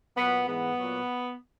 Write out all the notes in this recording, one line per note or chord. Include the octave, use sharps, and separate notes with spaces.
A#2 F#3 B3
G#2 E3 B3
A#2 F#3